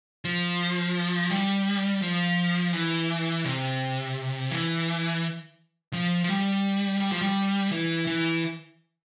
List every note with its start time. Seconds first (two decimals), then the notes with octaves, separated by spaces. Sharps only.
0.25 F3
1.30 G3
2.02 F3
2.73 E3
3.44 C3
4.51 E3
5.93 F3
6.24 F3
6.30 G3
7.00 G3
7.12 F3
7.22 G3
7.72 E3
8.07 E3